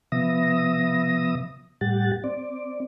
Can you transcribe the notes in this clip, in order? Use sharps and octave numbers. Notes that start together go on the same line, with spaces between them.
C3 F3 B3 E5 D#6 A#6
A2 G3 G4 F#5 A6
C4 D5